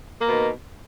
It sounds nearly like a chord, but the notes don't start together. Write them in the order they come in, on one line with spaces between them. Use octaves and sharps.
A#3 B2 D#3